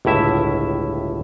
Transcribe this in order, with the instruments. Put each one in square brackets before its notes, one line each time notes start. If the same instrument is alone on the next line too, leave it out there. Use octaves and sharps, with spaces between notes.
[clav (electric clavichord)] G1 C#2 A2 E4 E5